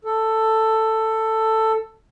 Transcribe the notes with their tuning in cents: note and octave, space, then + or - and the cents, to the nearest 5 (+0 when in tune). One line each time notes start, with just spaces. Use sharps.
A4 +10